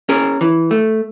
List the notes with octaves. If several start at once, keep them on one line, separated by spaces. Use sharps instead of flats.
C#4 G#4 A#4
E3
A3